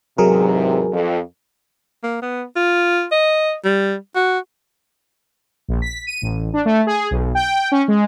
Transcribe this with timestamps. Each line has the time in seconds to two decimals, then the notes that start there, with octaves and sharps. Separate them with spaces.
0.18 E2 G#2 C3 F#3 G#4 A#4
0.92 F2
2.04 A#3
2.22 B3
2.56 F4
3.12 D#5
3.64 G3
4.16 F#4
5.68 A#1
5.82 B6
6.07 D#7
6.22 A1
6.53 D4
6.65 A3
6.87 G#4
7.11 B1
7.35 G5
7.72 C#4
7.88 G#3